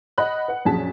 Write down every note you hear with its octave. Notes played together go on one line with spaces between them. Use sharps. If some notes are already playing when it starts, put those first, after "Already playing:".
D#5 F#5 B5 F#6
B4 F#5
A#1 F#2 G#4 A5 B6